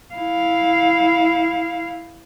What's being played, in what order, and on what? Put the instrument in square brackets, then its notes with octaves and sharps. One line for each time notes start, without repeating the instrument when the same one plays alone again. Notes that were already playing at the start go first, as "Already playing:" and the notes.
[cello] E4 F5